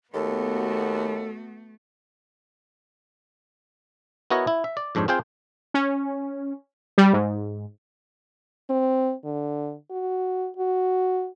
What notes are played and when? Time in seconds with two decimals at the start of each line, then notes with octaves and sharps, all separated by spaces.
0.14 D#2 A3 B3 F#4 A4
4.30 B3 E4 F#4 A#4 C#5 D#5
4.47 E4
4.64 E5
4.77 D5
4.95 F2 G#2 D4 C5 C#5
5.08 C4 F4 G#4 C5 F5 G5
5.74 C#4
6.98 G3
7.13 G#2
8.70 C4
9.25 D3
9.91 F#4
10.57 F#4